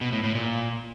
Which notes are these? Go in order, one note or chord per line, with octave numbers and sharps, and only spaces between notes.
B2
A2
A2
A#2